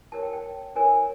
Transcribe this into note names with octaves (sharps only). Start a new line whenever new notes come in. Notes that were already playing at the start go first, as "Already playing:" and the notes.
E4 G4 A#4 C#5 A5
G5
G5
E4 G4 A#4 C#5 G#5